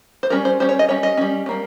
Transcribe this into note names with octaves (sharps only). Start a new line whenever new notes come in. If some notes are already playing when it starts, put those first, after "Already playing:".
C5
G3 C#4 A#4
C5
G3 C#4 C5
C#5
D#5
G3 C#4 C#5
D#5
G3 C#4
C#4
G3 A#3